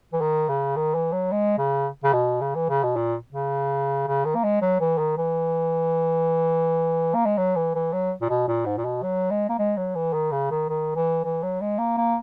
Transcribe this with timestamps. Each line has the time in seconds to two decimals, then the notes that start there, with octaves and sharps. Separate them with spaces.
0.13 E3
0.21 D#3
0.49 C#3
0.76 D#3
0.94 E3
1.12 F#3
1.32 G#3
1.58 C#3
2.04 C#3
2.13 B2
2.41 C#3
2.55 E3
2.70 C#3
2.83 B2
2.96 A#2
3.33 C#3
4.07 C#3
4.25 D#3
4.35 A#3
4.44 G#3
4.61 F#3
4.80 E3
4.98 D#3
5.17 E3
7.14 A#3
7.25 G#3
7.38 F#3
7.56 E3
7.75 E3
7.93 F#3
8.21 A#2
8.29 B2
8.48 A#2
8.66 G#2
8.78 A#2
8.85 B2
9.03 F#3
9.30 G#3
9.49 A#3
9.58 G#3
9.77 F#3
9.95 E3
10.13 D#3
10.32 C#3
10.51 D#3
10.69 D#3
10.96 E3
11.24 E3
11.43 F#3
11.61 G#3
11.78 A#3
11.97 A#3